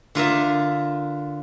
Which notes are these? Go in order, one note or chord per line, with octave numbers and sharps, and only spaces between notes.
D3 F4 A#4 E5